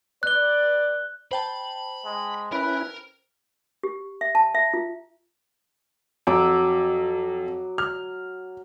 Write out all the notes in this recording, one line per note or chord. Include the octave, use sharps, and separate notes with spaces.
B4 D5 F#6 G7
C5 G5 A5 B5
G#3
C#4 E4 A#4 B4
G4
E5
A5
E5
F4
F2 F#3 D6 E6
F6